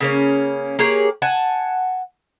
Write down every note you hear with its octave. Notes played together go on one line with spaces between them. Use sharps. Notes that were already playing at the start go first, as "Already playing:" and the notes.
C#3 A#3 C#4
A#3 G4 G#4 C#5
F#5 G#5 A5